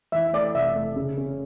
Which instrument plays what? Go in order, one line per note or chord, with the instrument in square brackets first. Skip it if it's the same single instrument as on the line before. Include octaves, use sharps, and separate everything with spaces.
[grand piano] E3 [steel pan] E5
[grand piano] A3 [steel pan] D5
[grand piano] F1 [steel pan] E5
[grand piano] A3
C#3
C#4